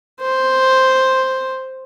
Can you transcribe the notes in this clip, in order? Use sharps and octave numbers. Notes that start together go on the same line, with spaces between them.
C5